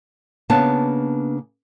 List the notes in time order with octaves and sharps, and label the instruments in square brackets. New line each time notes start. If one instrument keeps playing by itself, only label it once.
[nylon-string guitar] C#3 A#3 B3 D4 A5